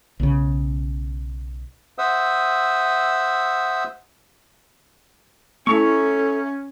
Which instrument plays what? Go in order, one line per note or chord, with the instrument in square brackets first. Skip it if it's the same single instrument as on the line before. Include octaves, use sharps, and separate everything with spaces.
[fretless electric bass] B1 C#3
[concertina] C5 E5 F#5 D#6 E6
[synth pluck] A3 E4 [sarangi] C#4 [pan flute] A4 [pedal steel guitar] E5 A#5 C#6